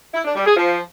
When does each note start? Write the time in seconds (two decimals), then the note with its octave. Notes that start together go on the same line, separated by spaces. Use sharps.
0.14 E4
0.25 D4
0.35 G3
0.46 G#4
0.56 F3